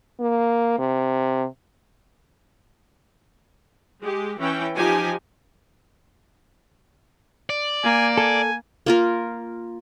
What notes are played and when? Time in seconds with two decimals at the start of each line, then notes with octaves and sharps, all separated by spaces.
0.20 A#3
0.78 C3
4.01 G#3 G4
4.39 E3 C#4 G5
4.75 F3 D#4 G4 G#5
7.50 D5
7.84 A#3 G#5
8.18 A4 G#5
8.86 A#3 F4 A#4